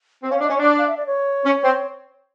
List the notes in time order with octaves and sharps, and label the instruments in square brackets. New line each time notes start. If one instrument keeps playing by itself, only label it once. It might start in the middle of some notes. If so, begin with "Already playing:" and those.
[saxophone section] C4
[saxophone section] C#4 [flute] F5
[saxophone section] D4
[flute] D#5
[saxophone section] C#4
[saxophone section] D4 [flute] D5
[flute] F5
E5
D5
C#5
[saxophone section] C#4
C4